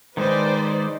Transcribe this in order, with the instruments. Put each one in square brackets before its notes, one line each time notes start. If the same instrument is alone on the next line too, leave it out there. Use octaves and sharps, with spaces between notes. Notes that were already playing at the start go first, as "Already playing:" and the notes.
[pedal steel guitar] D#3 G#3 D#4 [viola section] B4 C5 D5